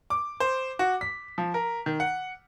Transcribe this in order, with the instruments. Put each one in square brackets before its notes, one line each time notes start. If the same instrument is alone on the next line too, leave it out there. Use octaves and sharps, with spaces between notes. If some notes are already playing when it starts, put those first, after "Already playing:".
[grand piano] D6
C5
F#4
B6
F3
A#4
D#3
F#5